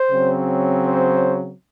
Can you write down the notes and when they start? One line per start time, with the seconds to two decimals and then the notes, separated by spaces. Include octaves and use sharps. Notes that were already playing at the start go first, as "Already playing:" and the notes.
Already playing: C5
0.11 C#3 F#3 C4
0.83 C5